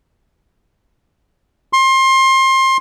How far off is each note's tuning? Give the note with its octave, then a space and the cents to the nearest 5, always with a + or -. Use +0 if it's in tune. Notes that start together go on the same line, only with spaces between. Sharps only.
C6 +25